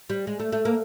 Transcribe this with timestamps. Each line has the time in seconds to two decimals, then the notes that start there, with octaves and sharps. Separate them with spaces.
0.10 G3
0.27 G#3
0.40 A3
0.52 A3
0.65 A#3